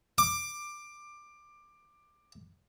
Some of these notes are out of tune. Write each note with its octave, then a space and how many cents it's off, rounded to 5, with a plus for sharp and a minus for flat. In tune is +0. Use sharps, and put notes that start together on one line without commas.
D6 +15